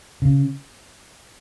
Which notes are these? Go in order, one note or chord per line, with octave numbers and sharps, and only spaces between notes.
C#3